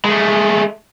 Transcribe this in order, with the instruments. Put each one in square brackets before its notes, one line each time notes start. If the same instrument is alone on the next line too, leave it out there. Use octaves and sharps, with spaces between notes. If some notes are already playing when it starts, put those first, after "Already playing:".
[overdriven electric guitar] G#3 A3